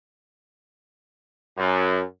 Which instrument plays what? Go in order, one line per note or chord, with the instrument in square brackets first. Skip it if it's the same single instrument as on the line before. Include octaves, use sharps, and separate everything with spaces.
[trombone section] F#2